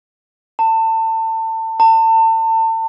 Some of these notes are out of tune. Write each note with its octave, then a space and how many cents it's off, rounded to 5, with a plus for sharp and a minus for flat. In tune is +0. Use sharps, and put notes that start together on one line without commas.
A5 +30
A5 +35